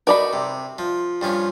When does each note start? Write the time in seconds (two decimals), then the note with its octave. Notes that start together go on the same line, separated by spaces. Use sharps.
0.07 D#4 F#4 A#4 D5 B5
0.33 C3
0.78 F3
1.21 G2 F3 C#4